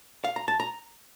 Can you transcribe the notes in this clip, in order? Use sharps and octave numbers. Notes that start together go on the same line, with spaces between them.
F5
A#5
A5
A#5